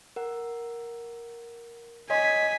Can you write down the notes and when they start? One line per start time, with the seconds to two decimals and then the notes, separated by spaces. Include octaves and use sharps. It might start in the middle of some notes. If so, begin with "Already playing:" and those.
0.16 A#4 F#5
2.10 C#5 D#5 G#5 C6 B6